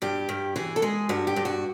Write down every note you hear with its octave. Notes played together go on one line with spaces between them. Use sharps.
G2 G4
G2
E3 G#4
A4
G#3 G#4
G2 F#4
G4
G2
F#4